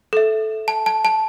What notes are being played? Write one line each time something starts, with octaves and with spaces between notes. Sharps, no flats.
A4 E5
A5
A5
A5